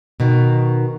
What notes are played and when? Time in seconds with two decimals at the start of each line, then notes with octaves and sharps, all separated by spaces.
0.20 B2 D#3